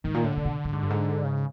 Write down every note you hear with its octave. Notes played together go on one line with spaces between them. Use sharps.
G#2 D#3
A#2
A2 D3
C3
B2
A2
G#2
G2
G#2
C#3